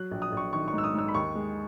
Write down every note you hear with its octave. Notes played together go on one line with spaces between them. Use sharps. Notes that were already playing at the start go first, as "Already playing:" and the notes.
Already playing: F#3 F#6
A#1
D#6
A#1 C#6
D#3 C#6
C#6
G#2
E6
D#6
G#2 E6
B5
D#2 C#6
G#3